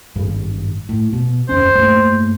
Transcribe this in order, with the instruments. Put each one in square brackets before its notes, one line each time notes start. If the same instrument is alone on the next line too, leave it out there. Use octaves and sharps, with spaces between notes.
[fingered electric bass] G#1 G2 G3
A2
B2
[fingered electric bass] F#1 E2 C#4 [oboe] C5
[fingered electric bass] G2 A3 A#3